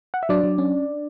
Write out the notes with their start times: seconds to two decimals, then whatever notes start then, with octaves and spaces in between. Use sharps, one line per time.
0.14 F#5
0.23 E5
0.29 F#3 D4 D5
0.44 F#3
0.58 C#4